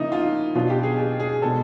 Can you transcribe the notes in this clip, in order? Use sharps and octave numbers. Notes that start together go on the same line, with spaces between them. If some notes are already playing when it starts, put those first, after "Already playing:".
Already playing: C#3 F3 A#3 D#4 E4
F4
B2 F#3 B3 D4 F4
G4
G#4
G4
G#4
B2 G#3 B3 D4 A4